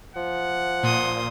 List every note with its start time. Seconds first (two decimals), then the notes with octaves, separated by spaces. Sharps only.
0.16 F3 F#5
0.83 A#2 C6 D#6